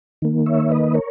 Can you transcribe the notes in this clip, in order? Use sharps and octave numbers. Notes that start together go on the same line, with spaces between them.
D#3 A#3
C#5 E5
B4 D#5
A#4 C#5